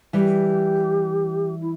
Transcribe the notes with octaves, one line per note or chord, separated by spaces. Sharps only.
E3 G3 G4
E4